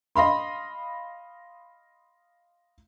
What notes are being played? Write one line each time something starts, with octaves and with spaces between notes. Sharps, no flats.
D#5 F5 B5 C6